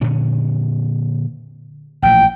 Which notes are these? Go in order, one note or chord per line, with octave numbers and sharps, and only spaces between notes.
A#2 D3 C#4
A1 A#2 F3 G5